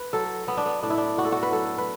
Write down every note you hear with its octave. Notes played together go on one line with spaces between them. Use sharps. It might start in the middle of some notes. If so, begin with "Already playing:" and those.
Already playing: B4
F#3 A4
F#3 B3
D4
B3
A2 D4
E4
D4
A2 F#4
A4
F#4
B4
F#3 A4
B4